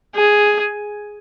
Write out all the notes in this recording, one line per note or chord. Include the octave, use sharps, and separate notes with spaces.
G#4